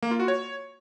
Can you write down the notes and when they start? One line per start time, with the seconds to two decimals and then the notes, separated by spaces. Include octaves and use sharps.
0.03 A#3
0.11 F4
0.20 F#4
0.28 C#5